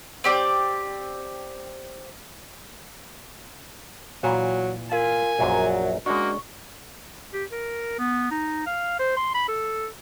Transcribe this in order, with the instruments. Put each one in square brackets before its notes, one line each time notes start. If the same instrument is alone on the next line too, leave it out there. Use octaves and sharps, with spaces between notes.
[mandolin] C4 G4 D5
[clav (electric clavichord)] A#2 E3 [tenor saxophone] F#3
[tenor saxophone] F4 [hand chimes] A#4 F5 [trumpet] G#5
[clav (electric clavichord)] A#1 F#2 A#2 [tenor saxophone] F#3
[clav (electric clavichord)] G#3 C#4 D4 [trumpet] A#3 [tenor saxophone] F#4 [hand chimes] C#6
[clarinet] G4
A#4
B3
D#4
F5
C5
C6
B5
A4